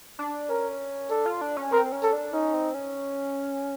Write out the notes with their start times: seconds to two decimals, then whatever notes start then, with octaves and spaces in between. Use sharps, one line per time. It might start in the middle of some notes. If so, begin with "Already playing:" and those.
0.19 D4
0.49 C#4 A#4
1.10 D4 A4
1.26 F4
1.41 D4
1.57 C#4
1.72 C4 A#4
1.92 C#4
2.03 A4
2.13 D4
2.33 C#4 D#4
2.54 C4
2.74 C#4